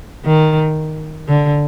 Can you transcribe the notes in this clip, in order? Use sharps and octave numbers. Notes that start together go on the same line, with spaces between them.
D#3
D3